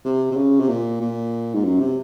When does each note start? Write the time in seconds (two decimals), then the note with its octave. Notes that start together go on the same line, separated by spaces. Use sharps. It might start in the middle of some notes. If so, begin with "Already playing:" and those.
0.05 C3
0.32 C3
0.37 C#3
0.60 C3
0.68 A#2
1.01 A#2
1.54 G#2
1.64 F#2
1.80 C3